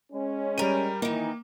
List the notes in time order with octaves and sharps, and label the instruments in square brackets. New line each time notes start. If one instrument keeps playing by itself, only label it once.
[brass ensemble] G#3 C#4
[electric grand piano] G3 D#7 [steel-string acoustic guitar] A#4 G5
[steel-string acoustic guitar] D#3 D#4 [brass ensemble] E3 [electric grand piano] A#3